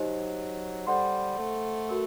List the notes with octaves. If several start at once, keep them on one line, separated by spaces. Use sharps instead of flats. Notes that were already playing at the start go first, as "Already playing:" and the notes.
Already playing: F#3 D#4 G4 C5 D#5
G3 A4 C5 F#5 C6
A3
F#4 A#4